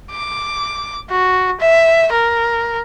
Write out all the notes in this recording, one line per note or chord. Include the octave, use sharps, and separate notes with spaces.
D6
F#4
E5
A#4